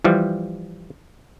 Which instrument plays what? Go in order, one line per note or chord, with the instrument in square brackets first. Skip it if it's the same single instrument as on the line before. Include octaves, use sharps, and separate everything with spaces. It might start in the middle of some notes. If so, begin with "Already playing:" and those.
[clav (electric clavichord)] E3 F3 G3